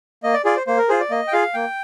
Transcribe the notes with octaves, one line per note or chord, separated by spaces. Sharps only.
A#3 D#5
D5
F4 G#4 D5
C5
A#3 C5
A#4
F4 G#4 C5
D5
A#3 D#5
G5
F4 G#4 F5
A#3 G5